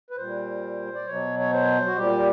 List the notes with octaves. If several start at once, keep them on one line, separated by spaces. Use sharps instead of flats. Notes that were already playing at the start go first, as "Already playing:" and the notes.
B4
A#2 G3 C5
D5
B2 F#3 C#5
C#5
C5
F#4
A#2 G3 G4